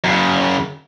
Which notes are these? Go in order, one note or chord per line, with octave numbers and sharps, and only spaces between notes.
F#2 C#3